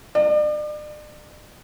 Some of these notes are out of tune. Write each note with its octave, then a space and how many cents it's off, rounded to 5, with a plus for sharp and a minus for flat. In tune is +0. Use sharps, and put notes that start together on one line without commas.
D5 +40